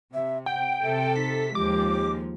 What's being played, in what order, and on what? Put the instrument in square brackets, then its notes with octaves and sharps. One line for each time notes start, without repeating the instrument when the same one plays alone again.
[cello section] C3 [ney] E5
[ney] F#5 [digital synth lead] G5
[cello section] C3 A4 [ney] E5
[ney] D#4 [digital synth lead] B6
[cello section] D#2 F3 G#3 [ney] G4 [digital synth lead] D6